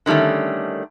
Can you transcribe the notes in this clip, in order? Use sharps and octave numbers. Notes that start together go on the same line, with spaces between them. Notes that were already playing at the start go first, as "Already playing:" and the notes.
D3 D#3 G3 A3 C#4